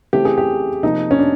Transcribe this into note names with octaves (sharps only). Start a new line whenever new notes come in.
C#3 E3 A3 C4 G4
G#4
G4
C3 F3 A#3 D#4
C#4
D4